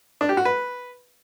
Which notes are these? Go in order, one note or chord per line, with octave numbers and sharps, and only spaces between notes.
D4
G4
F#4
B4